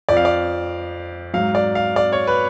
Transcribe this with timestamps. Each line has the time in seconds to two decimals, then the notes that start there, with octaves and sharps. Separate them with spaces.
0.09 F2 F3 D5
0.17 F5
0.25 D5
1.34 G#2 F#3 F5
1.55 D5
1.75 F5
1.96 D5
2.12 C#5
2.27 B4